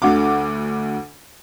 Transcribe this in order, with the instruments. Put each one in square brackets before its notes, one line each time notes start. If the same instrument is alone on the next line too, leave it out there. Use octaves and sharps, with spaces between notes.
[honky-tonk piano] D2 D3 F#4 D6